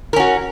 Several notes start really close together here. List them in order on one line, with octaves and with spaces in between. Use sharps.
A#4 C#4 F#4